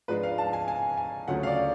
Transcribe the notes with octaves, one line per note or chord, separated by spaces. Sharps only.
G#2 F3 G#3 D4 B4
F5
A5
G#5
G#5
G#5
D2 C#3 F#3 C#4 F4 F#5
F5
D5